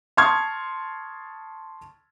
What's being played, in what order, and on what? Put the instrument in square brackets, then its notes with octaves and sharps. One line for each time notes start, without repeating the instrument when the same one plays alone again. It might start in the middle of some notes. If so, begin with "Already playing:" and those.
[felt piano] A5 C6 C#6 D#6 F6 G#6